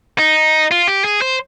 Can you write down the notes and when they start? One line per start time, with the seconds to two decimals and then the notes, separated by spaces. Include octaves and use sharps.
0.19 D#4
0.71 F4
0.88 G4
1.04 G#4
1.22 C5